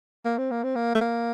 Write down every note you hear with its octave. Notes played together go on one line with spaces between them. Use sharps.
A#3
C4
A#3
C4
A#3
A3
A#3